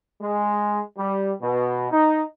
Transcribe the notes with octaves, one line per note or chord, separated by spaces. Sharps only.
G#3
G3
B2
D#4